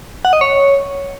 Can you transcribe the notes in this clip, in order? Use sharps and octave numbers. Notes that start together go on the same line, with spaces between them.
F#5
D#5
C#5